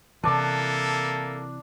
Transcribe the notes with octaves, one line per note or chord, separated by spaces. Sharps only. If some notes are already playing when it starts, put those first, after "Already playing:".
C3 E3 A#3 D4 E4 A4 A5 D6